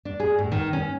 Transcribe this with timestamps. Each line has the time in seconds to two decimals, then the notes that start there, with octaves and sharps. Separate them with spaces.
0.05 D4
0.20 G#4
0.39 A2
0.52 D#3
0.73 C#4